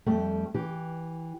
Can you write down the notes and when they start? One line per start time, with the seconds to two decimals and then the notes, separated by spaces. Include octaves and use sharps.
0.06 F2 G3 A3
0.54 E3 G4